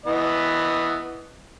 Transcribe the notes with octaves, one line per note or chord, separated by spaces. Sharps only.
E3 B3 D#5